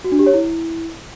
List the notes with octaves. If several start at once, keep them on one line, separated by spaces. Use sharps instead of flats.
F#4
D4
G4
C#5
E4